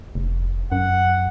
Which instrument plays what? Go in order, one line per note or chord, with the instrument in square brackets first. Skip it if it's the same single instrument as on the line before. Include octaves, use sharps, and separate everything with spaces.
[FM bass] F1
[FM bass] F#2 [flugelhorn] F#5